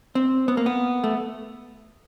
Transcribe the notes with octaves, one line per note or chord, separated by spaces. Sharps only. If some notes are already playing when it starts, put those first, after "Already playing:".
C4
B3
A#3
B3
A3